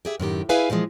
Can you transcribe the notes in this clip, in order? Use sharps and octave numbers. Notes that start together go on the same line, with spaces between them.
G4 G#4 E5
F#2 A2 D#3 G4
E4 G#4 B4 E5 F5 G#5
A#2 E3 F3 G#3